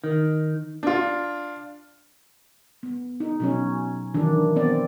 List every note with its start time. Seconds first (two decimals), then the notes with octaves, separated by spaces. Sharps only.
0.04 D#3
0.83 D4 F4
2.83 B3
3.20 D#4
3.40 B2 F#3 C#4
4.14 D#3 E3 F#3 D4
4.56 B3 C4 D5